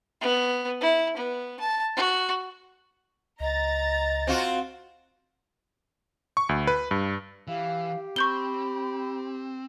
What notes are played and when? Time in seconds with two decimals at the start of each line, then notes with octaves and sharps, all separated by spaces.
0.21 B3
0.81 E4
1.17 B3
1.60 A5
1.96 F#4
3.40 C#2 D#5 A#5 A6
4.27 C4 F4 F#4
6.37 C#6
6.49 D2
6.67 B4
6.91 G2
7.48 E3 G4 F5
8.16 C4 B5 C#6 G6 G7